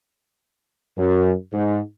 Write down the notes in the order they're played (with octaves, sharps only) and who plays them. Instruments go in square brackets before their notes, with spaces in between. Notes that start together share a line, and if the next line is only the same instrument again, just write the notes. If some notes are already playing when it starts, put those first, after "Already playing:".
[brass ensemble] F#2
G#2